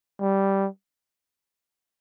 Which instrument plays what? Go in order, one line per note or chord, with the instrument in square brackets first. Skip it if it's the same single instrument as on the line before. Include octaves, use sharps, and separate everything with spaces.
[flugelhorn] G3